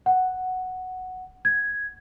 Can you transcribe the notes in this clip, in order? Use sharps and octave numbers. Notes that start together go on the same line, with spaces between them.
F#5
G#6